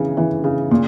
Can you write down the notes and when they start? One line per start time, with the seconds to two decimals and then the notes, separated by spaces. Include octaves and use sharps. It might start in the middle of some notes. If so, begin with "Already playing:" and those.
Already playing: C#3 E3
0.17 E3
0.44 C#3
0.71 A#2